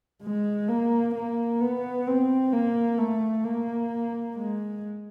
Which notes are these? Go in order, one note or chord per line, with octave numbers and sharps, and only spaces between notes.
G#3
A#3
A#3
B3
C4
A#3
A3
A#3
G#3